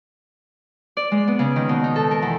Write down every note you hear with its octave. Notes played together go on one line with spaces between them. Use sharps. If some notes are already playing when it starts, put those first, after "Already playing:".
D5
G#3
B3
C#3
D#3
B2
D#4
A4
A#4
E2